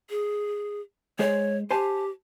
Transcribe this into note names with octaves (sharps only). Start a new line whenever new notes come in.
G#4
G#3 G#4 C5 C#5
G4 C5 G#5 A5